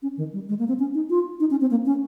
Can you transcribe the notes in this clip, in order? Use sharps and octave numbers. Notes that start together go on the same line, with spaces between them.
C#4
D#3
G3
G#3
A#3
C4
C#4
D#4
F4
D#4
C#4
C4
A#3
C#4